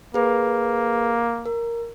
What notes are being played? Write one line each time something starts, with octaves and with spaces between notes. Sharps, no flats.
A#3 G#4 B4
A#4